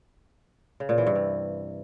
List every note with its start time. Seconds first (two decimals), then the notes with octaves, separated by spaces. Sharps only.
0.80 C#3
0.89 A#2
0.98 E3
1.07 G2
1.15 C3